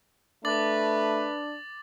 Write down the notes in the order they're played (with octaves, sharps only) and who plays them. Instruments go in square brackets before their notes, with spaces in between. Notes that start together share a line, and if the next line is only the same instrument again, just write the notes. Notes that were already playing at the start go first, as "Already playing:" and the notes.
[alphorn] A3 [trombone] D4 [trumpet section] B4 [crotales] D6 A6 F#7